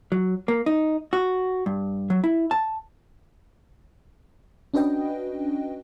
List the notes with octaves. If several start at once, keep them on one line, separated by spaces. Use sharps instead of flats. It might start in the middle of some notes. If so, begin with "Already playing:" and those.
F#3
A#3
D#4
F#4
G2
F#3
E4
A5
C#4 D4 F#4 B4 D#5 G5